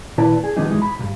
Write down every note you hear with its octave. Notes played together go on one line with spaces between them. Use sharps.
A#2 D#3 E4 B4 D5 A5
G#4
D#3 F3 G3 B3 D4 D#4
F#2 E3 G#3 D#4
B5
B1 G2